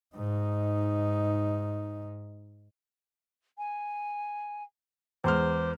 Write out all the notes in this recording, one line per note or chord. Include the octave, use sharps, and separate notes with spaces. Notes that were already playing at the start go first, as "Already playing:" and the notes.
G#2 D#4
G#5
E2 G#3 C5 D6 F6